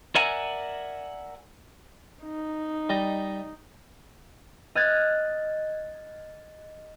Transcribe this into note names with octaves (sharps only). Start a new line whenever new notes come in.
A#4 D5 E5 F#5 G#5 A#5
D#4
G3 D#5 A#5
D#5 F6 F#6 G#6 A6